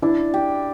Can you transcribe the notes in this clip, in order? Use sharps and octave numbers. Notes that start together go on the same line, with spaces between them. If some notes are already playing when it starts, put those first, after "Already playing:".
D4 E4
G4